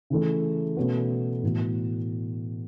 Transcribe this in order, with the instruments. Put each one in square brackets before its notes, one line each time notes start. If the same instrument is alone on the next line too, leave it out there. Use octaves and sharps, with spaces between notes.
[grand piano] C#3 E3 A3
B2 A3 C#4 F#4 B4
A2 E3 B3 F#4